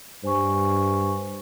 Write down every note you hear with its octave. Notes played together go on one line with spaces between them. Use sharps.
G2 C5 G#5 C#6